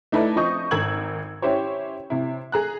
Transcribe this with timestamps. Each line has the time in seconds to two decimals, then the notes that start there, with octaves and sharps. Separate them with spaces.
0.12 A3 D#4 E4 A4 B4 D5
0.36 F3 C4 D#5 C#6 D#6 G6
0.71 G#1 A#4 E6 G#6 F#7
1.42 C#4 E4 G4 C5 C#5
2.10 C3 E4
2.52 G#4 A#5 F#6